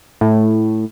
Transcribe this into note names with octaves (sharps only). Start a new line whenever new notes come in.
A2